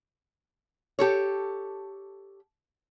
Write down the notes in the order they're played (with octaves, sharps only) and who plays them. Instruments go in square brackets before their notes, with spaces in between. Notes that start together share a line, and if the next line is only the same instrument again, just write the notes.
[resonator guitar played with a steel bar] G4 A4 C#5